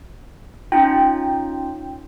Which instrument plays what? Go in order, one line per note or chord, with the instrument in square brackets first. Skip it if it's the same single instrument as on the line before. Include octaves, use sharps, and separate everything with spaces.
[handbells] C#4 D#4 F4 [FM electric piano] G5